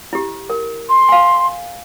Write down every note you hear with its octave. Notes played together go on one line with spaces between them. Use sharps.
E4 G4
A#4
C6
F5 G#5